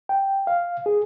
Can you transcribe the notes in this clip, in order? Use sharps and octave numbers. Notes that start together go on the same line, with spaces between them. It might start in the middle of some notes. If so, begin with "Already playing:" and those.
G5
F5
G#4